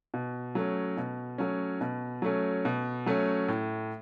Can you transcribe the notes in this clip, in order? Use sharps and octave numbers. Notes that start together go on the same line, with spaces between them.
B2
F#3 A3 C#4
B2
F#3 A3 C#4
B2
F#3 A3 C#4
B2
F#3 A3 C#4
A2